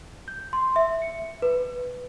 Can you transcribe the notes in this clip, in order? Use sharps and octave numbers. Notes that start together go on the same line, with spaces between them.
G6
C6
E5
C#7
B4